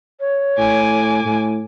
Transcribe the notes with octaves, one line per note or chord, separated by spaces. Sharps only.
C#5
A2 G#5 D6
A2